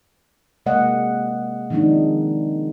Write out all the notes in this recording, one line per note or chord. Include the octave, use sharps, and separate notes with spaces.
C3 G#3 A#3 D#5 F#5
D#3 F3 G#3 C4 D4 D#4